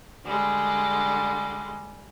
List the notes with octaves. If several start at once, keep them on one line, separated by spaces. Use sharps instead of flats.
D3 G3 G#3